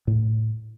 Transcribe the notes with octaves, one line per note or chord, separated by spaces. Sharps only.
A2